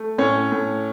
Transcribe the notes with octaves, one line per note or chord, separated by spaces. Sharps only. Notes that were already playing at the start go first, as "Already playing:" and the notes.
Already playing: A3
A2 C#4 C#5
A2